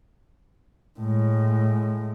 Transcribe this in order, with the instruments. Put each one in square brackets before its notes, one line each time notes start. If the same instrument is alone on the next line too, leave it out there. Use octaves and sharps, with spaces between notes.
[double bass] A2 G#3